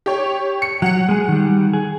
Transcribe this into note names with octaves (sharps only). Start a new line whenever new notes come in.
G4 C#5
C#7
F#3 F#5 C#7
G#3 G#4
D#3 G3
G#4